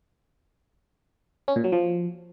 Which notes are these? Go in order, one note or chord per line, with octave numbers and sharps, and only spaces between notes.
C#4
A#2
F#3
F3